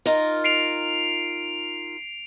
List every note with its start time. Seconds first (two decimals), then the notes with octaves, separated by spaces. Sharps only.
0.06 D#4 F4 A#4
0.44 C7 D7 F7